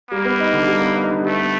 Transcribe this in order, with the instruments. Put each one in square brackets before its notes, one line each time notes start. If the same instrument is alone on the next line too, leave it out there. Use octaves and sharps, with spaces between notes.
[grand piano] G3 [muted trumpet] A#3
[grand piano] B3
D#4
D3
G3
B3
D#4
D3
[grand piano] G3 [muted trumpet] A3
[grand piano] B3